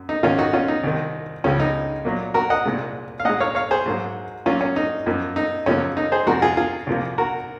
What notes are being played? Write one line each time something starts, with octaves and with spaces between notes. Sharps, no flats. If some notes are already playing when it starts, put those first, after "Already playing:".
Already playing: F#2
D#4
G#2 D#3 A#3 C#4 F4
D#4 F#4
C#4 F4
D#4
C2 C3 D#3
C#2 C#3 F3 C#4
D#4
A#2 F#3 A#3
F#4 A#4
D#5 F#5
C2 A#2 G#3
F5
A#2 G#3 D#5 F#5
C#5 F5
C#5 F5
G#4 C5
G#2 F#3 A#3
A#2 F#3 A#3 C#4 F4
C#4
D#4
F#2 F3 A#3
D#4
F#2 C#3 F3 A#3 C#4
D#4
G#4 C5
F2 C3 F3 G#3 F#4 A#4
F4 G#4
F4 G#4
C2 C3 F3 A#3
F#4 A#4